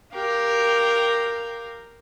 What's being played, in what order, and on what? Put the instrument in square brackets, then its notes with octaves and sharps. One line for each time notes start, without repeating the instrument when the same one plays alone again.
[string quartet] G4 A#4 F5